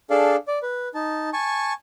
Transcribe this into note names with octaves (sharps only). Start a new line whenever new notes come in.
D4 G#4 A4 D5 F5
D5
B4
D#4 A5
G#5 A5 C#6